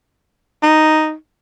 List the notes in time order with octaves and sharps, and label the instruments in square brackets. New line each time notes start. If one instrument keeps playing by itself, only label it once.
[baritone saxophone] D#4